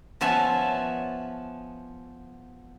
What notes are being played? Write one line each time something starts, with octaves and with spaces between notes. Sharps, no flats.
F3 B3 C#5 E5 G#5 A5